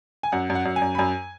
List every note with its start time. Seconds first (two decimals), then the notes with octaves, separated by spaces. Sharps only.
0.23 G#5
0.32 F#2 F#5
0.50 F#2
0.55 F#5
0.65 F#2
0.76 G#5
0.81 F#2
0.95 B5
0.98 F#2 G#5